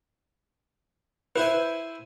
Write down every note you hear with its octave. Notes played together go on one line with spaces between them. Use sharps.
E4 B4 C5 G#5